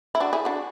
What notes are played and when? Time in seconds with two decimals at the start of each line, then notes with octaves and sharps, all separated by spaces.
0.15 E4
0.20 D4 F#4
0.33 E4 G#4
0.45 D4 F#4